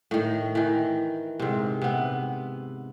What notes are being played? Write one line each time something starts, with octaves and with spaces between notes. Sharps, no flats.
A2 D#3
D#3 E3
G#2 C3
C3 B3